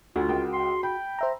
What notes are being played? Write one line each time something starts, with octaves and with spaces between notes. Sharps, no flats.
D2 F4 F#4
C#2 A#4 G5
C6
G5 B5
C5 E5 A#5